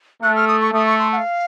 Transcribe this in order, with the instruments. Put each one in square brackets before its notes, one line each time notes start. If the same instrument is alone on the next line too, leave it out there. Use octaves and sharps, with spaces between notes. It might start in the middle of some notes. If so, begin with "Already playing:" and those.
[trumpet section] A3 [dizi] F#6
[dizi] F6
D#6
C#6
[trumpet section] A3 [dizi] D#6
[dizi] C#6
C6
F#5
F5